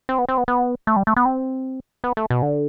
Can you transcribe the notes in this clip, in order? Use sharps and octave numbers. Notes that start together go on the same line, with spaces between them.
C4
B3
C4
B3
B3
A3
G3
A3
B3
C4
B3
A3
B2
D3